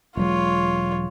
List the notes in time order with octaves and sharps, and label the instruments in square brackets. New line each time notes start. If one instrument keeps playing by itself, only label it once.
[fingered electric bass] E1 F#3 G#3 [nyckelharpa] F4 C#5